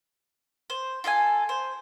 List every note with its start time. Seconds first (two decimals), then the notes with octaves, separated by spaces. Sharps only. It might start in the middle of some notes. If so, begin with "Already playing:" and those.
0.70 C5
1.04 F4 A4 E5 G#5
1.49 C5